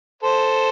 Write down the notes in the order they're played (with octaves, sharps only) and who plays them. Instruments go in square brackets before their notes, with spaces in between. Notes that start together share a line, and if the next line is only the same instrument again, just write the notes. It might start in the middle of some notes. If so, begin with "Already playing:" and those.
[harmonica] A4 C5